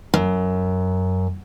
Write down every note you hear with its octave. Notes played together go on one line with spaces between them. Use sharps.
F#2